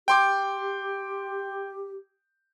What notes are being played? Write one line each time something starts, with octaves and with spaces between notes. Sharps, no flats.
G4 G5 C6 D6